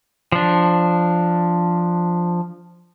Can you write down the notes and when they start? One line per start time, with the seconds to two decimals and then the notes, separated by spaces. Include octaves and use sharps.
0.32 F3 D4